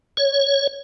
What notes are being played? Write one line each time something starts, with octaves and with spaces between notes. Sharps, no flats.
C#5